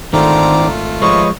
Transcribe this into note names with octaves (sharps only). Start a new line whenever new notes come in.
G#1 D3 D#3 A3 C4 F4 A#5 D6
F3 G#3 B4 C#5 D#5 C#6